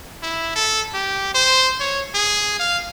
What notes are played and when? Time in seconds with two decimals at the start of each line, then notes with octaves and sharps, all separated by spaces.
0.23 E4
0.56 A4
0.94 G4
1.35 C5
1.80 C#5
2.15 G#4
2.59 F5